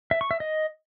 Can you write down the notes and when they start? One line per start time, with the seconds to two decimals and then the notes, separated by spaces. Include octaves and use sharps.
0.11 E5
0.21 C#6
0.31 E5
0.40 D#5